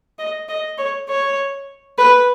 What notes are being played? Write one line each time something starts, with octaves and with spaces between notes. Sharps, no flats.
D#5
D#5
C#5
C#5
B4